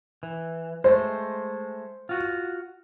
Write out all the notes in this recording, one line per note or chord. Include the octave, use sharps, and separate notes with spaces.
E3
G#3 A3 C5
F4 F#4